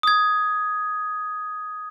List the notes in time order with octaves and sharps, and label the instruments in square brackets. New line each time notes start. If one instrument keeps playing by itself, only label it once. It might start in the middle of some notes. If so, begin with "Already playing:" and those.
[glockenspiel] D#6 G#6